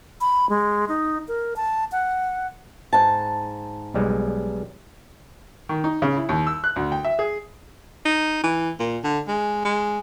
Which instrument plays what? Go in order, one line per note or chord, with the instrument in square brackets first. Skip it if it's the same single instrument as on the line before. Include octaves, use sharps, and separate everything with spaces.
[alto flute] B5
G#3
D#4
A#4
A5
F#5
[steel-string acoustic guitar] G#2 A5
[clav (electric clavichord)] B1 G3 G#3
[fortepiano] D#3
D#4
C#3
E4
D#2
E6
F#6
D2
G5
E5
G#4
[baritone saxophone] D#4
E3
A#2
D3
G#3
G#3